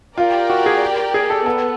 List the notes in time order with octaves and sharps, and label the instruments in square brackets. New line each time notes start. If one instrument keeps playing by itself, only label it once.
[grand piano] F4 [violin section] G4 A#4 D5 G5
[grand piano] F#4
G#4
G#4
A4
[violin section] B3 [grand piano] A4